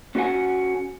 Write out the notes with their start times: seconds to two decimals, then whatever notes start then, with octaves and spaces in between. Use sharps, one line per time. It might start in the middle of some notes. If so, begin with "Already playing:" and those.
0.15 C#4 F#4 A4 A#4 F#5 G#5